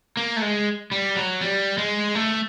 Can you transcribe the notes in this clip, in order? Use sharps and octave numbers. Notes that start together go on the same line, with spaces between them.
A#3
A3
G#3
G3
F#3
G3
G#3
A3